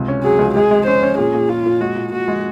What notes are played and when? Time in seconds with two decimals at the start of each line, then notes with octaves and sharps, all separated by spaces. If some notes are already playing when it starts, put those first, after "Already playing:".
Already playing: C#2 C3
0.08 C#4
0.24 F#3 G#4
0.39 C#2
0.55 G#3 G#4
0.71 G#3
0.87 C#4 C5
1.03 C#4
1.18 A#2 G#4
1.34 A#2
1.49 A#2 F4
1.66 A#2
1.81 G#3 F#4
1.96 A#2
2.12 A#2 F#4
2.28 G#3